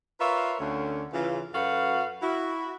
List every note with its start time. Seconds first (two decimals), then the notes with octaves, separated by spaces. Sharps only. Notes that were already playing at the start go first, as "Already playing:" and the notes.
0.20 F4 A#4 B4 C#5 E5 F5
0.60 D2 D3 C#4
1.13 C#3 E3 F4
1.54 F#2 F#4 A4 B4 F5 F#5
2.22 E4 F#4